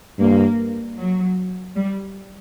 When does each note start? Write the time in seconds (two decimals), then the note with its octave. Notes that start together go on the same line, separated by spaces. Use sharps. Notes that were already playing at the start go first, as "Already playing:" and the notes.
0.18 G2 A#3
0.97 F#3
1.75 G3